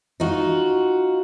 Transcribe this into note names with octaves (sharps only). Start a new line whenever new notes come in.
D#4 F4 F#4